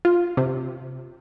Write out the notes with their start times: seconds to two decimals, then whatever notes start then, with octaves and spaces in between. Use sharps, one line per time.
0.05 F4
0.37 C3